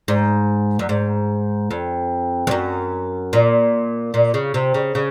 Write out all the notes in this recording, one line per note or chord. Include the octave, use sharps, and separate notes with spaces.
G#2
F#2
G#2
F2
F2
F#2
A#2
A#2
C#3
C3
C#3
C#3